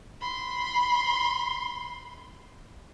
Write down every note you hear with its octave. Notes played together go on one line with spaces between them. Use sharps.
B5 C6